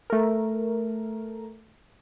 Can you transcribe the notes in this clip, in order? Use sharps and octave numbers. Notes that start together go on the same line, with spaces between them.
A3 A#4